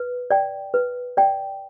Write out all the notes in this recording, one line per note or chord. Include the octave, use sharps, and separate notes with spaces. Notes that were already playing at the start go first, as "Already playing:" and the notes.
Already playing: B4
D5 G5
B4
D5 G5